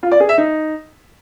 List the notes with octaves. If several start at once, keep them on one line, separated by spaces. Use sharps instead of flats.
F4
D5
G#4
E5
D#4